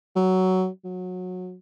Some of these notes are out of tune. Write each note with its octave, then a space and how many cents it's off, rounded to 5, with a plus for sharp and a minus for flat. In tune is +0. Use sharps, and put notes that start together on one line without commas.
F#3 +10
F#3 -20